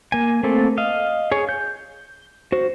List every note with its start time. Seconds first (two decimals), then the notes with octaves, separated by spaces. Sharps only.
0.12 A#3 G#5
0.43 A3 A#3 C4 A4
0.77 D#5 F5
1.32 G#4 C#5
1.49 G6
2.52 F#4 C5